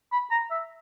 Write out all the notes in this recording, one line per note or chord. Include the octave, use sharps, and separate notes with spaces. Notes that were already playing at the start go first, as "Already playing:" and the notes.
B5
A#5
E5